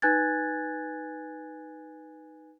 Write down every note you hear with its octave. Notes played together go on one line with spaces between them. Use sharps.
D#4 B4 G#5 F#6 G#6 A6